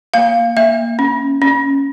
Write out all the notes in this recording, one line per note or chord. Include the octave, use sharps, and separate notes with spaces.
A#3 F5
A#3 E5
C#4
C#4